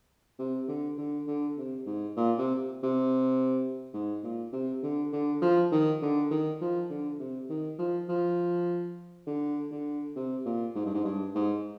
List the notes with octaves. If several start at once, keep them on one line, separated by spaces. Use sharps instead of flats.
C3
D3
D3
D3
C3
G#2
A#2
C3
C3
G#2
A#2
C3
D3
D3
F3
D#3
D3
D#3
F3
D3
C3
D#3
F3
F3
D3
D3
C3
A#2
G#2
G2
G#2
G2
G#2